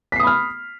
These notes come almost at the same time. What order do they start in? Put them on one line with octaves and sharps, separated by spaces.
B6 C7 D#6 B5 F6